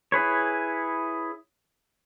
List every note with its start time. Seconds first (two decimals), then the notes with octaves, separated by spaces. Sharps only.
0.12 E4 G#4 B4 C#5